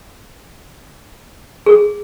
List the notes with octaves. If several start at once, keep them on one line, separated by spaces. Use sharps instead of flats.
G#4